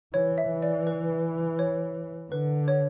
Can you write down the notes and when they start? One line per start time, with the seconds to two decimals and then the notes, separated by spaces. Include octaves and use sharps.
0.14 E3 C#5
0.38 E5
0.51 E3
0.62 D5
0.87 B4
1.59 C#5
2.31 D3 B4
2.68 C#5